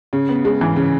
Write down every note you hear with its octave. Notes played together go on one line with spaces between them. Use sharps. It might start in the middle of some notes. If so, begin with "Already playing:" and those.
C#3
B3
G#3
E3
C#3